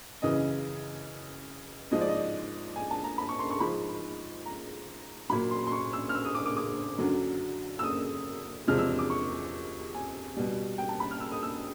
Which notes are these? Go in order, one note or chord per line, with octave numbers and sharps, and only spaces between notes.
F#2 C#3 E3 D#5
G#2 F3 G#3 D#5
D5
D#5
G#5
A5
A#5
B5
C#6
C6
C#6
G#2 F3 G#3 B5
A#5
A#2 F#3 B5
C6
C6
C#6
E6
F6
E6
D#6
D6
D6
D6
F#2 D3 F#3
E6
D#6
E2 C3 F3 G#3 F6
E6
D6
C#6
G#5
B2 G3
G5
A5
B5
F6
E6
D#6
E6